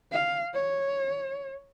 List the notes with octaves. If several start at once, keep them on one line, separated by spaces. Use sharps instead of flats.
F5
C#5